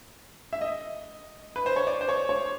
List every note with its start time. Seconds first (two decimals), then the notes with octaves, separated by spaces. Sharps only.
0.53 E5
0.61 D#5
1.56 B4
1.66 C5
1.76 C#5
1.87 D5
2.01 C5
2.09 C#5
2.29 C#5